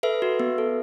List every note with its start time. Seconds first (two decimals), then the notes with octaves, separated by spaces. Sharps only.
0.03 A4 B4 E5
0.22 F#4
0.40 B3
0.58 A4